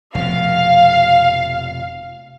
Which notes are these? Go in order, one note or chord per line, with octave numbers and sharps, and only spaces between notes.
F1 B2 F5